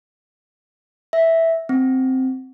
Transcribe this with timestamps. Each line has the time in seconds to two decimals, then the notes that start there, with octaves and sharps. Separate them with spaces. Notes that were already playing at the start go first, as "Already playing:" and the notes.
1.13 E5
1.69 C4